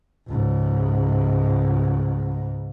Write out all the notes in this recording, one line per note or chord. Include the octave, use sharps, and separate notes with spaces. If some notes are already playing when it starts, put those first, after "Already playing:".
C#2 G#2